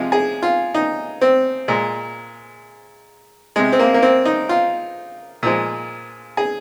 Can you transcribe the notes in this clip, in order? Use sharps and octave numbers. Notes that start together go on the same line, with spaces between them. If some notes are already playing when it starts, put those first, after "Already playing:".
Already playing: C3 F3 G#3 F4
G#4
F4
D#4
C4
A#2 G#3
C3 G#3
C4
A#3
A#3
C4
D#4
F4
A#2 F3 G#3
G#4